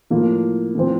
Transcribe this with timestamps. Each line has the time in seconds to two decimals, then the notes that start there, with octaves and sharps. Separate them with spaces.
0.10 A2 F3 A#3
0.75 A2 F3 C4